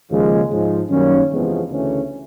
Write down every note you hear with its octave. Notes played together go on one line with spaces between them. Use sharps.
D#2 C#3 F3 G#3
G#2 F3 G#3
F#2 D#3 G3 A#3 C#4
E2 C3 F3 G#3 B3
D2 C#3 E3 A3 C#4